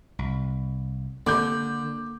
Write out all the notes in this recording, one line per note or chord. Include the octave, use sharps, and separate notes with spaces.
C2
D3 A#3 D6 G6